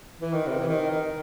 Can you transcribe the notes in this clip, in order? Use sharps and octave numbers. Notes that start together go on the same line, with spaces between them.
E3
D#3
C3
E3
D#3
D#3